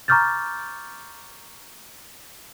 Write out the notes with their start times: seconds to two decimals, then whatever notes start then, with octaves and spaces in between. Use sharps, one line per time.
0.08 A#5 C#6 D6 F6 G6 A6